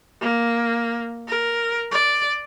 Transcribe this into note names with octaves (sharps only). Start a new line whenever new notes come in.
A#3
A#4
D5